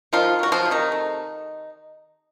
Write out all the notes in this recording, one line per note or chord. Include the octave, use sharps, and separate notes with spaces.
D#3 F3 F4
F#3 F#4
F3 F4
C3
D#3 D#4
A3